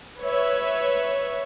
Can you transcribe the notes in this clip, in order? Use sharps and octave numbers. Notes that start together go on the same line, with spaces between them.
B4 C#5 E5